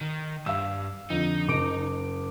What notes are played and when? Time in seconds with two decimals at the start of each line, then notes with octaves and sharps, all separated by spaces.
0.01 D#3
0.46 G2 F5 E6
1.10 F2 D3 D#4
1.48 F#1 D6 D7